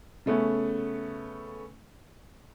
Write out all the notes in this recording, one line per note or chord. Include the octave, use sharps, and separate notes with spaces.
C#3 A3 B3 C#4